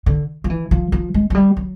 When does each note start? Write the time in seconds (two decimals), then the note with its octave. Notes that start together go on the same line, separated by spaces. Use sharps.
0.06 D3
0.44 F3
0.50 E3
0.71 F3
0.92 F3
1.14 G#3
1.30 F#3
1.35 G3
1.57 F#3